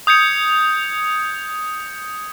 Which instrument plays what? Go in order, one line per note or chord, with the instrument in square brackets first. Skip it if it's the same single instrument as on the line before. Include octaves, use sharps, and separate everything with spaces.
[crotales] D#6 G6 G#6 C#7 F7